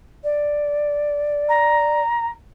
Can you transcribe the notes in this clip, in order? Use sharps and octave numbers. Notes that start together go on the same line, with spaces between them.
D5
A#5